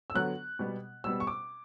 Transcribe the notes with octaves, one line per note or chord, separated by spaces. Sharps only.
E6
D3 F#3 B3 F#6
B2 G3 B3
B2 G3 B3 E6
C#6
D6